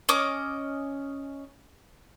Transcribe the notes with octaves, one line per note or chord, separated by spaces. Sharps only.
C#4 D#5 D6